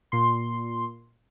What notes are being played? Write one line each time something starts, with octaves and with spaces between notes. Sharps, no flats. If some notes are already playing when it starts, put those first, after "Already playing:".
A#2 C6